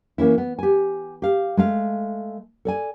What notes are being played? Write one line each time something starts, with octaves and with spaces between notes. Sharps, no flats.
E3 A#3 C#4 E4
B3
G4 G#5
G4 F5
G#3 A3 F5
A4 D5 G#5